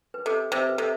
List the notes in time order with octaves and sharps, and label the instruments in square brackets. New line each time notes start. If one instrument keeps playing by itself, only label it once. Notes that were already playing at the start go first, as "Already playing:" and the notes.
[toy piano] B4
[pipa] C3 [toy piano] A4
[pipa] C3 [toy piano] C5
[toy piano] B4
[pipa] C3 [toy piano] A4